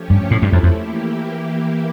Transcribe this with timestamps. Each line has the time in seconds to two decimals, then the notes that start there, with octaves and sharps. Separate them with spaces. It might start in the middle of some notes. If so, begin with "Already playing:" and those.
Already playing: F3 A3 C#4 G4 C#5
0.10 G2
0.30 A2 F3 A3 E4
0.42 G2
0.52 F2
0.63 F2
0.74 E3 A#3 E4 G4